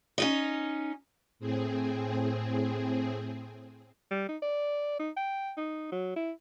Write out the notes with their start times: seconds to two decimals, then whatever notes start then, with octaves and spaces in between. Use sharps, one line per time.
0.18 C#4 D#4 D#5
1.39 A2 C4 G#4
4.11 G3
4.29 D#4
4.42 D5
5.00 D#4
5.17 G5
5.57 D#4
5.92 F#3
6.16 E4